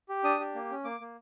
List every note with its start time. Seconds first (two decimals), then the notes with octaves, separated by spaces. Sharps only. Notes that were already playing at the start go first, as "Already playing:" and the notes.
0.09 G4
0.24 D4 D#6
0.40 G4
0.55 A#3
0.70 C#4
0.84 A#3 D6
1.00 A#3